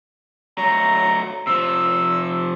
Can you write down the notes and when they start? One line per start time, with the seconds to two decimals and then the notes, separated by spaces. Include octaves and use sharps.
0.58 F#3 A3 A#5
1.47 C3 F3 E6